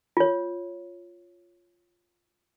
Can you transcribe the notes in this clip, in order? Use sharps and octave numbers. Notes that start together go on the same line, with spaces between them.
F4 C#5